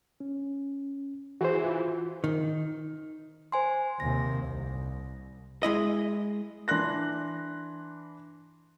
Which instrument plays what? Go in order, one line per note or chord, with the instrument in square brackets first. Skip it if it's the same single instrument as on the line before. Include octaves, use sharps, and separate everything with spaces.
[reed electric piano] C#4
[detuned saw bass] E3 [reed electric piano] F#4 G#4 C5
[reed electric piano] F4
[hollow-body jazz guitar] D#3
[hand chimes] C5 G#5 C6
[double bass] D#2 C3 [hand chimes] A#6
[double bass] C2
[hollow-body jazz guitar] G#3 E4 D#5
[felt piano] E3 D4 C6 F#6 A#6